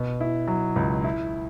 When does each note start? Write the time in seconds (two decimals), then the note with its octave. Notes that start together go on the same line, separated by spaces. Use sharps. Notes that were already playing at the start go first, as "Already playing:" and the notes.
Already playing: B2
0.20 E4
0.48 F#3
0.76 C#2
1.04 E4